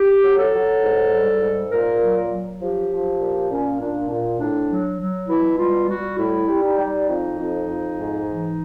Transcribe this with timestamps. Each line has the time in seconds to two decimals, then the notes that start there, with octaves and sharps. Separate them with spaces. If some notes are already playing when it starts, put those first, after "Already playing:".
Already playing: G4
0.23 F#3
0.38 A4
0.53 F#3
0.83 G#2
1.13 G3
1.42 G#2
1.72 A#2 A#4
2.01 F#3
2.32 F#3
2.61 F3 G4
2.91 F3
3.20 A#2
3.51 A#2 C#4
3.80 A#2 D4
4.10 A#2
4.40 A2 D4
4.69 F#3
5.00 F#3
5.29 B2 E4
5.58 G3 F4
5.88 G3 F#4
6.19 A2 E4
6.48 G3
6.63 D#4
6.78 G3
7.08 F2
7.38 F2
7.67 F2
7.97 G#2
8.27 E3